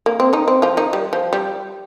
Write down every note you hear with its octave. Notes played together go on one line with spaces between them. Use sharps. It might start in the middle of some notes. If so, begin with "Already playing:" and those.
A#3
C4
D#3 D#4
C4
F3 F4
D#3 D#4
G3
F3
G3